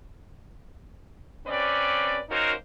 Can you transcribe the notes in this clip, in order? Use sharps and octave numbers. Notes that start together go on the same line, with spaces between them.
C3 C4 C#4 B4 D5
A#3 C#4 D#4 F#4 A#4 C5